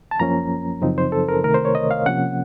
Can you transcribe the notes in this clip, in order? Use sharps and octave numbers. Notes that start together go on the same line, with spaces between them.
A5
F#2 F3 A#3 C#4 A#5
F#2 C#3 F3 C4 D#4
C5
A4
A#4
C2 C3 D#3 A3 A#4
C5
C#5
D#5
F5
C3 F3 A#3 C#4 F#5